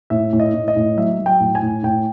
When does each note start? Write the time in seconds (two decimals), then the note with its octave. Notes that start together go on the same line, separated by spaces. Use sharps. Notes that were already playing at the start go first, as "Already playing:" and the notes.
0.10 A2 E5
0.33 A2
0.40 D#5
0.54 A2
0.68 D#5
0.76 A2
0.97 F#3 E5
1.19 F#3
1.26 G5
1.40 A2
1.55 G#5
1.62 A2
1.83 A2 G5